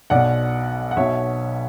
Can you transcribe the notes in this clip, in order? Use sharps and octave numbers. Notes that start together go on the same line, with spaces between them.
B1 B2 D5 F#5
F#5
B1 B2 C#5 E5